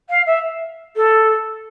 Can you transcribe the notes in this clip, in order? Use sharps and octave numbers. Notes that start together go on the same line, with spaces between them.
F5
E5
A4